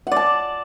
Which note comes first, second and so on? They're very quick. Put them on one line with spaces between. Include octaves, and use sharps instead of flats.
F#5 D5 A5